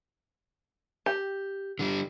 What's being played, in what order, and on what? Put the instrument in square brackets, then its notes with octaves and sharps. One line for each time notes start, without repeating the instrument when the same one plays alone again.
[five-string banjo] G4
[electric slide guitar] D3 G3